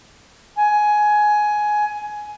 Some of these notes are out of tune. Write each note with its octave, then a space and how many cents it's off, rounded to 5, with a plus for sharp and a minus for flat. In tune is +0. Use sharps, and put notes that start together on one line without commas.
G#5 +15